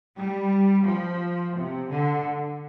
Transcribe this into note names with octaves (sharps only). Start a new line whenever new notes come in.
G3
F3
C3
D3